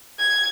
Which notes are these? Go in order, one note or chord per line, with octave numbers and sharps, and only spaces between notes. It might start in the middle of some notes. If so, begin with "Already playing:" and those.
G#6